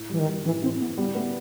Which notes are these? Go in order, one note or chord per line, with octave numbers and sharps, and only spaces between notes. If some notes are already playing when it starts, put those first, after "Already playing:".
Already playing: A2
E3 G3
D#3
G3
A2 E3
A2 C4
A2 B3
G3 B3
A3 B3